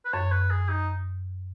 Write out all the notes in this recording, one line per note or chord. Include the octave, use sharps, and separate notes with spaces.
B4
F#2 C#5
B4
G#4
D#4